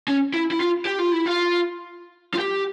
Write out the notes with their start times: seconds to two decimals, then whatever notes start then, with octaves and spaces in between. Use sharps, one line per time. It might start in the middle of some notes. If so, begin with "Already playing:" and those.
0.08 C#4
0.34 E4
0.51 E4
0.60 F4
0.85 G4
0.99 F4
1.12 E4
1.26 F4
2.34 F4
2.39 G4